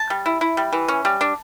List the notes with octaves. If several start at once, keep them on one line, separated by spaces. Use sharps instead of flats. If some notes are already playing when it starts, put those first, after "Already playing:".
Already playing: A5
G3
E4
E4
G3
E3
C#4
G3
D4